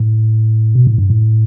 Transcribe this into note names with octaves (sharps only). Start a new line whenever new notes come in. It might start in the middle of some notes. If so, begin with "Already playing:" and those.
Already playing: A2
B2
A2
G2
A2